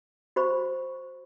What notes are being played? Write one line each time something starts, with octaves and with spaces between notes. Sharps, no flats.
F#4 C5 B5 C#6